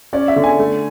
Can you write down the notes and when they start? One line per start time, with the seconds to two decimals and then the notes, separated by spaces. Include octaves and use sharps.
0.13 C#4 D5
0.28 E5
0.36 D3
0.44 G#5
0.59 A3